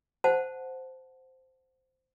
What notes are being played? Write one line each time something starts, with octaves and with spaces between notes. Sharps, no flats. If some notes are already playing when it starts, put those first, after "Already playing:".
C5 F#5 A5